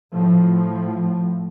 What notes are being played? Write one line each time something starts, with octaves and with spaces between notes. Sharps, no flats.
A2 F3